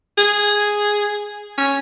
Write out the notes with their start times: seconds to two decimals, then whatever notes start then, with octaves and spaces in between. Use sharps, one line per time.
0.18 G#4
1.58 C#4